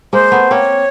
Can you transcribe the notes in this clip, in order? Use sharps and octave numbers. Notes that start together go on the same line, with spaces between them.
G#3 A#3 C5
A3 B3
A#3 C4 C#5